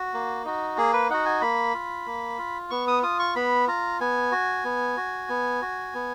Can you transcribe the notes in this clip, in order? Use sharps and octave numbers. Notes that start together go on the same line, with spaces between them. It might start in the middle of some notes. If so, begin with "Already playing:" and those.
Already playing: F#4
A#3
D#4 F#4
A#3 G#4
B4
D#4 F#4 F#5
G#5
A#3 B5
F4
A#3
F4
B3 C#6
D#6
F4 D#6
C#6
B3 B5
F4 A#5
B3 G#5
F#4
B3
F#4
B3
F#4
B3